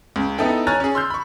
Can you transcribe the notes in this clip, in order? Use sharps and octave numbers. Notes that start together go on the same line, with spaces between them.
C#2
B3 D#4 E4 A4 G5
C#5 G#5 A#5 F6 F#6 A6
C#4 G#4
C6 E6 F6 G6
B5 C#6